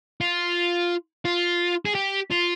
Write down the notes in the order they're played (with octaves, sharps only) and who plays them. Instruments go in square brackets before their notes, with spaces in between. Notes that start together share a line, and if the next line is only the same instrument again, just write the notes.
[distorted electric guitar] F4
F4
G#4
G4
F4